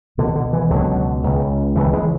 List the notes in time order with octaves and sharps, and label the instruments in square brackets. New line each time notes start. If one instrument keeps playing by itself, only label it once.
[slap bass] C#2 B2 D3
D3
E3
C#2 B2 D3 F#3
C#2 C#3
C#2 C#3 E3
E3 G#3